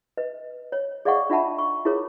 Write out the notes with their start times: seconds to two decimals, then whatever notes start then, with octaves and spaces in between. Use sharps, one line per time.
0.17 B4 D#5
0.72 C#5
1.05 G#4 D5 D#5 F5 F#5 C#6
1.30 D4 F4 E5 F#5 A5 B5
1.58 C#6
1.85 E4 F4 G#4 A#4 C#5